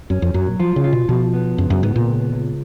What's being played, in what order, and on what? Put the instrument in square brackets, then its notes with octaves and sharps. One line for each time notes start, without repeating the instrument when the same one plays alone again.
[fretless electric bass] F#2 [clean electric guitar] C#4
[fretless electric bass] F2
[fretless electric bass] F#2 [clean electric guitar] F#3
[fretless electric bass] A#2
[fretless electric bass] F3 [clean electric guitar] F4
[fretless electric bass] C#3
[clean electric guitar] F4
[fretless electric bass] B2
[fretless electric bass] B2 [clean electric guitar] F3
[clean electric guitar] B3
[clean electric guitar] C#2 [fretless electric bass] F#2
[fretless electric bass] F#2
[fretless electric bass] G#2 [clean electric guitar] B3
[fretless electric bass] A#2
[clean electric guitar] C#2
C#2